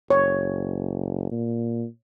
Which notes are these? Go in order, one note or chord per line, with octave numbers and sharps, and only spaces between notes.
F#1 C#5
A#2